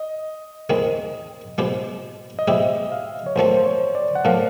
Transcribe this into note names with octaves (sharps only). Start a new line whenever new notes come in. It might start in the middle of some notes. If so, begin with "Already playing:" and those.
Already playing: D#5
D#2 D#3 G#3 C4 E4 D#5
B2 G#3 C4 E4 G4
D#5
B2 G#3 C4 E4 G4 E5
F5
C#5
B1 A#2 F3 A3 C4 C5
C5
C#5
D5
F#5
A#2 F3 A3 C4 F5